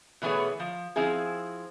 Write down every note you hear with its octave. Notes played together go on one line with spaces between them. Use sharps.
B2 E3 A3 B3 G#4 C#5
F3
F3 C4 E4 G#4